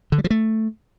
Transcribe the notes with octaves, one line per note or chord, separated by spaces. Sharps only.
D3
G3
F3
A3